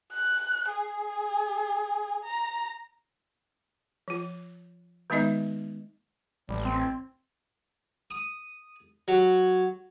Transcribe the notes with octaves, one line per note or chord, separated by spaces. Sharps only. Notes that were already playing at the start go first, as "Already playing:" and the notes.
F#6
G#4
A#5
F3 F4
D#3 G#3 B3 D#4 D#5 E5
A1 G3
C4
D#6
F#3